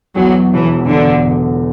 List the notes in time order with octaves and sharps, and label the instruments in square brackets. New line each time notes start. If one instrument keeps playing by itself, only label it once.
[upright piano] E2 [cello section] F#3
[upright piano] E1 [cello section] E3
[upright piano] E1 [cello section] D3
[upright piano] D3